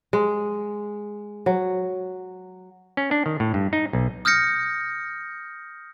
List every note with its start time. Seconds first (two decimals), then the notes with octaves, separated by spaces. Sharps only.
0.13 G#3
1.46 F#3
2.97 C#4
3.11 D4
3.26 D#3
3.40 A2
3.54 G2
3.73 D#4
3.93 B1
4.25 D#6 F6 G6 A#6 C#7